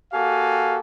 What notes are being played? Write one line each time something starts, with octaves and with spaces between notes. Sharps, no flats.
A#3 F#4 G4 A4 F5 G#5